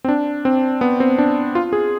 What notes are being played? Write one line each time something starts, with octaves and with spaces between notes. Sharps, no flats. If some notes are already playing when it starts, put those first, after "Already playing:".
C4
D4
C4
B3
C4
D4
F4
G#4